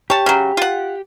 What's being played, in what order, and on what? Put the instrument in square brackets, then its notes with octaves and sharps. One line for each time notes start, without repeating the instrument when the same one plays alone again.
[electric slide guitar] G4 [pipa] C#5 A5
[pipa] C#3 F#3
F4 F#5